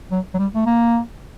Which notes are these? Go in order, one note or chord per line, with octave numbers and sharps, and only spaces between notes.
F#3
F#3
G3
A3
A#3